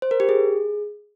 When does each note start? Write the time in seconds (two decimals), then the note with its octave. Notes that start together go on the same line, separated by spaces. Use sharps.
0.02 C5
0.11 A#4
0.20 G4
0.29 G#4